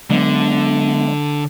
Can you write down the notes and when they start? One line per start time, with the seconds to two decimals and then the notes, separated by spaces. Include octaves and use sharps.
0.10 D3 F#3 G#3 B3